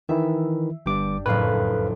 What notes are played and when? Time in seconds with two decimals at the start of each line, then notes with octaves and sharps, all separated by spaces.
0.09 D#3 E3 E4 E5
0.86 G1 G2 D4 G4 D6
1.26 F#1 F2 A2 B4 F5